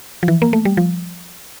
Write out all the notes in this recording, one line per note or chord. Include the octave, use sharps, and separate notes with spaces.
F3
E3
A#3
A3
G3
F3